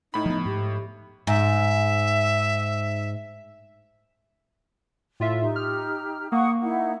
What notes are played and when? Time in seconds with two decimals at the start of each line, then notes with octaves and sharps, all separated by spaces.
0.14 A2 D#4 B5
0.26 F3 B3
0.45 G#2 G4
1.27 G#2 E5
5.20 A2 F4 E5
5.41 D#4 G4
5.56 F6
6.32 A#3 F#5 C#6 D#6
6.61 D#4 E4 F#5